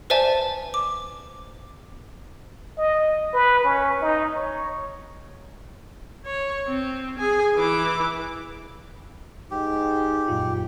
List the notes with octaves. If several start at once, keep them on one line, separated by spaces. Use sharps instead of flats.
B4 C5 D5 E5 G#5 A5
D6
D#5
B4
C#4
D#4
C#5
C#5
C4
G#4 G#5
E3 D6
G#2 G4
F#2 A#2 F4